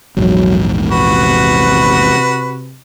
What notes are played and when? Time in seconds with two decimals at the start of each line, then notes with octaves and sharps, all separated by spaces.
0.17 A#1 E2 G#2 F#3
0.91 C3 F#4 B4